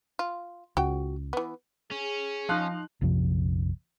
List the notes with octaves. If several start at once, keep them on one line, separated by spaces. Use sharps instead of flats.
F4
C#2 F#4 G5
E3 B3
C#4 G#4
F3 D#4 F5 F#6
A#1 F2 C3 F3